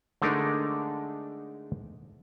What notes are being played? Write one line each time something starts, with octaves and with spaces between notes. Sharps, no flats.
D3 G#3 A3 D4 D#4 A#4